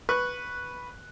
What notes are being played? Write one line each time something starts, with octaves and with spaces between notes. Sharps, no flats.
B4 C#6 F#6